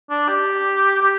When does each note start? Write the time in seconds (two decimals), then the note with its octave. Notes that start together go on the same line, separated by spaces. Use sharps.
0.10 D4
0.28 G4
1.02 G4